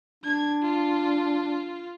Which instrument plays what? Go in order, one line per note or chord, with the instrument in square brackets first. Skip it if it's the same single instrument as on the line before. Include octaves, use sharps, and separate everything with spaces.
[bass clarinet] D4 [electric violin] G#6
[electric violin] F4